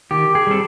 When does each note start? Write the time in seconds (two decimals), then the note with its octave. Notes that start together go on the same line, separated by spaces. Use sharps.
0.11 D#3 G4
0.35 G#4
0.47 G3 C4 A4